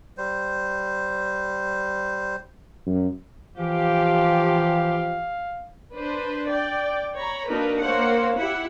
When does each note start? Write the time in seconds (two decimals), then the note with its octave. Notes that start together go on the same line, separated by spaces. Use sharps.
0.18 G3 C5
2.86 F#2
3.57 E3 F3 G4 F5
5.96 D4 B4 C5
6.50 D5 G5
7.17 C#5 A#5 B5
7.48 A#3 D4 D#4 F#4 A#4 B4
7.82 A#3 C5 C#5 F5 F#5
8.36 E4 G4 F#5